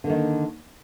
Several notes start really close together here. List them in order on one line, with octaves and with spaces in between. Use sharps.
D3 A#3 D#3